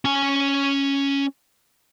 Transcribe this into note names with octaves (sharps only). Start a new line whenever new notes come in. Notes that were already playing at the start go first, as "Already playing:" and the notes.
C#4 G#5